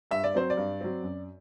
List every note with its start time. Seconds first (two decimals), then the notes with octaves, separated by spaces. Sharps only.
0.11 G2 E5
0.24 D5
0.34 F#3 C4 C5
0.50 D5
0.57 G2
0.81 F#3 C4
1.03 F#2